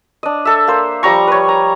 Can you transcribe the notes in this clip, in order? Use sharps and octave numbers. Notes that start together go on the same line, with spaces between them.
D4 D#5
A4 E5
A#3 C5
F3 G3 A#5 C#6
B4 C#5
A#5